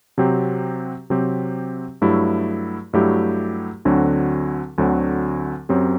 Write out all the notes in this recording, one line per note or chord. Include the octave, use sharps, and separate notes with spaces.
C3 F#3 C4 G4
C3 F#3 C4 G4
G2 F#3 A3 E4 G4
G2 F#3 A3 E4 G4
D2 D3 F#3 C4 F#4
D2 D3 F#3 C4 F#4
F#2 F#3 C4 G4